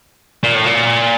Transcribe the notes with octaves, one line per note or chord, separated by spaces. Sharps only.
A#2
A2
A#2